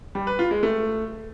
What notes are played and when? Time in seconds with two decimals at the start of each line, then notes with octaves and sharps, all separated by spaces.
0.15 G3
0.27 B4
0.39 F4
0.51 G#3
0.63 A3